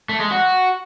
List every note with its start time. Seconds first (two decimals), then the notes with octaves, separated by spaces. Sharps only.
0.09 A3
0.20 G#3
0.31 F#4